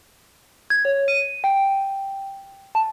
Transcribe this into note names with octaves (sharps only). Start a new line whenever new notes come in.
G#6
C#5
D#7
G5
A5